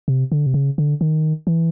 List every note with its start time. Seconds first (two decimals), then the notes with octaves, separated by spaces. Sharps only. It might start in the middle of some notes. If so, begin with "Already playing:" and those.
0.08 C3
0.32 D3
0.46 C3
0.54 C#3
0.78 D3
1.01 D#3
1.47 E3